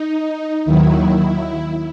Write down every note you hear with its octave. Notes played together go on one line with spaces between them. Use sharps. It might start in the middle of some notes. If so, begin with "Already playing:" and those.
Already playing: D#4
D#2 D#3 F#3 E4